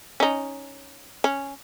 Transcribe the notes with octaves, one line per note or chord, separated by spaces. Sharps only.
C#4 D#4
C#4